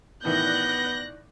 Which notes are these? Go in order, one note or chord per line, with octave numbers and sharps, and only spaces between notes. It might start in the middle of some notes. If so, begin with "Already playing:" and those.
A2 D#3 E3 B3 D5 F#6 G6 A#6